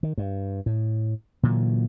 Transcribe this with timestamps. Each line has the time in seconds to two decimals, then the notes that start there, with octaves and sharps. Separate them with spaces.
0.03 D#3
0.18 G2
0.66 A2
1.43 A#2 D3 E3 F#3